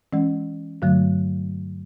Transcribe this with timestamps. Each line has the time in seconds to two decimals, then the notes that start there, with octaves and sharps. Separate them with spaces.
0.13 E3 G#3 C#4
0.82 G2 D3 F#3 A3